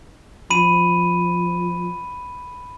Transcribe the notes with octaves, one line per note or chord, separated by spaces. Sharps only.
F3 B5 D#7